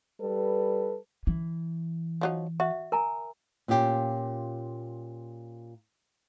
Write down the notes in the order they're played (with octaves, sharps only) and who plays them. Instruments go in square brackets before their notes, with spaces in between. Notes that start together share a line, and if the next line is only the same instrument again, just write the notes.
[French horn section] G3 A4 B4
[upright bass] E3
[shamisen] F3 F#3 D#4
[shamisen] F#4 [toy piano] E5
[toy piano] A#4 G#5 A#5
[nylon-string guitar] A#2 C#4 F4 G4